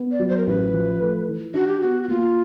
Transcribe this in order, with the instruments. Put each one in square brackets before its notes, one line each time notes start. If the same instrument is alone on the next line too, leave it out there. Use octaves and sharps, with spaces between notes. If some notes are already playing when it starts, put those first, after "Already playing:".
Already playing: [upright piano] B3
[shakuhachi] D5
[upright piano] F#3
[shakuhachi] C5
A#4
[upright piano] A1 [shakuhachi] B4
[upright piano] F3
A3
E3
[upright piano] D4 [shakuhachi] F#4
[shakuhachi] G4
[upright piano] B3 [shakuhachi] F#4
[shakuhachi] F#4
[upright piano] A#3 [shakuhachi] F4